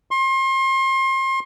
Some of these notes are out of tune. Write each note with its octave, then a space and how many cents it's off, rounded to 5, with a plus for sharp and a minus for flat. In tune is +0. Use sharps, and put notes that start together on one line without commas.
C6 +35